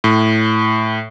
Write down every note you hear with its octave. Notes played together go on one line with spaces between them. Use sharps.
A2